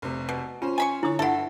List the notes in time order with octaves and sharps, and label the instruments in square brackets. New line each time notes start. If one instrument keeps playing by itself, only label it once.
[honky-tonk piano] F1 C3
[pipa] B2
[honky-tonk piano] C#4 C5 [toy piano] F4
[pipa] G#5 B5 C#6
[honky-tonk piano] D3 C#5 [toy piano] E4 D#6
[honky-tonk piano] G2 [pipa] E4 A4 [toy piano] E5 F#5